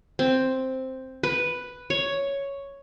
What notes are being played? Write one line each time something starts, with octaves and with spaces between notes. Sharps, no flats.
C4
B4
C#5